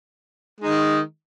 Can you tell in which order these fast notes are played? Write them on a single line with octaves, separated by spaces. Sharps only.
G#3 D#4 D#3